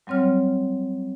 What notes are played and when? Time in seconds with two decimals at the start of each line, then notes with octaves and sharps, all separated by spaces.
0.07 F#3 G3 C4 C#5 F6